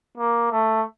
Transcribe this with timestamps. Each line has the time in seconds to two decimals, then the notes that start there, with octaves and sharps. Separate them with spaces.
0.17 A#3
0.52 A3